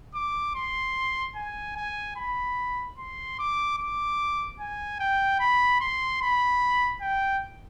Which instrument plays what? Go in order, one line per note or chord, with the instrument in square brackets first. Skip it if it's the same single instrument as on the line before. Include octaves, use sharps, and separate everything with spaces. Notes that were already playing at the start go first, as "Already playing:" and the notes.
[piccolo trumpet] D6
C6
G#5
G#5
B5
C6
D6
D6
G#5
G5
B5
C6
B5
G5